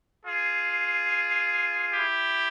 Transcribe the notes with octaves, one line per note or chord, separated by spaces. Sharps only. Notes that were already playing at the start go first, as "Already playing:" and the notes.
F4 G#4
E4 G4